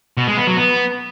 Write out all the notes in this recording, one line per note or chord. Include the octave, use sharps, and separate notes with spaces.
B2
G#3
B3
F#3
B3